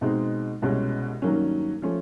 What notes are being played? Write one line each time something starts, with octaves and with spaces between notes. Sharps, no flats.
B2 G#3 C4 D#4
C2 B2 G#3 C#4
G2 D#3 F#3 A#3 C#4
F3 A3 C#4